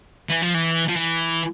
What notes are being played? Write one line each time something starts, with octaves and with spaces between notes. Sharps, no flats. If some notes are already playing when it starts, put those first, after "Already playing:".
E3
F3
E3
F3
E3